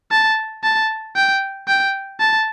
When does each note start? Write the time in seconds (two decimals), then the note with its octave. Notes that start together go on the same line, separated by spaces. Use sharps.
0.11 A5
0.64 A5
1.16 G5
1.68 G5
2.20 A5